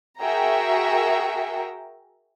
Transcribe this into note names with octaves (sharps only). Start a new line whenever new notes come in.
F#4 G#4 A#4 E5 G5 A#5